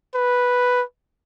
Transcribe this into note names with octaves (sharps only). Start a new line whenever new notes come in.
B4